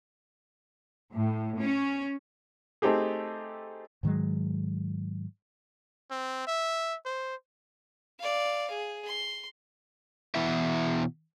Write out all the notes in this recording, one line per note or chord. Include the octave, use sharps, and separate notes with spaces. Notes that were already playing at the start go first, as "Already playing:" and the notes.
A2
C#4
A3 C4 D#4 G4 G#4
G#2 D#3 F#3 G#3
C4
E5
C5
D5 F5
G#4
C6
B2 E3 B3 E4 E5